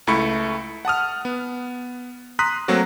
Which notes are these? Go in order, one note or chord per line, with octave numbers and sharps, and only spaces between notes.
C#2 A3 E4 B5 C#6 C#7
F#5 A5 D#6 F6
B3
A#5 C6 D#6 F#6 B6
F#3 A3 A#3 C4 F#4